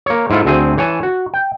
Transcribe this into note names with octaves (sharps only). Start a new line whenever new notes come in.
A#3 C#5
G#2 E4 F4 A4
D2 A3 C4 G#4 G#5
E3 C#5 G#5 A5
F#4
G5